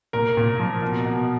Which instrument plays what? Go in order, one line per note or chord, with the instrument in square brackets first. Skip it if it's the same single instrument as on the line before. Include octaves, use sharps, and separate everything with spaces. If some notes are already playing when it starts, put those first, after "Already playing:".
[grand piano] A#2 A#4
A#2
F3
B2
B2